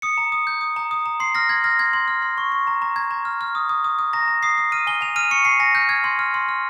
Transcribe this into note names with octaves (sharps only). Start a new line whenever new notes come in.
D#6 C#7
A#5
D#6
G6
D#6
A#5
D#6
A#5
C6 C7
F6 A#6
C6 G#6
F6 A#6
C6 G#6
C6
F6
C6
C#6
C#6
A#5
A#5
A#5 G#6
A#5
F6
F6
D#6
D#6
D#6
D#6
A#5 A#6
A#5
D#6 C7
D#6
F6 D#7
G#5 G7
G#5 F7
F6 D#7
C#6 C#7
G#5 C7
G#5 A#6
F6 G6
F6 G#6
C6
F6
C6
F6